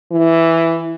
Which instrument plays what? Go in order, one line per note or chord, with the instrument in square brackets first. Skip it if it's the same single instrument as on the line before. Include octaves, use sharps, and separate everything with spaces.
[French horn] E3